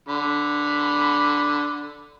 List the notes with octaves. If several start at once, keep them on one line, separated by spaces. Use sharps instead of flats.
D3 B5